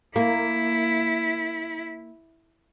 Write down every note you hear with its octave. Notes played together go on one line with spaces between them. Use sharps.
A#3 E4